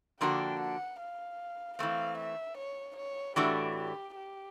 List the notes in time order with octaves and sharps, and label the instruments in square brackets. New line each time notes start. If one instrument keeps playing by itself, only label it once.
[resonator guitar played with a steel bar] D3 F3 A#3 D4 F#4 [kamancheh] G5
[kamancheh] F#5
F5
[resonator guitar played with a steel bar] E3 A3 C4 [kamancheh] F5
[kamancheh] E5
C#5
C#5
[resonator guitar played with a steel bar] A2 E3 A3 D4 F#4 [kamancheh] G4
[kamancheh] G4
G4